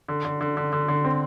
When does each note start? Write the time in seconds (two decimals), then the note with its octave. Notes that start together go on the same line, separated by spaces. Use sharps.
0.08 D3
0.25 D3
0.41 D3
0.57 D3
0.73 D3
0.88 D3
1.05 C4